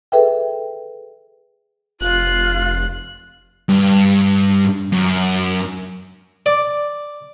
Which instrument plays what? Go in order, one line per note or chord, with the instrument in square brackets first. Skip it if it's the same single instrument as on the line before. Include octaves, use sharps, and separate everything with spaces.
[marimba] G#4 A4 B4 E5 G5
[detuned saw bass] F1 [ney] F4 [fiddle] F#6
[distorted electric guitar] G2
F#2
[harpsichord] D5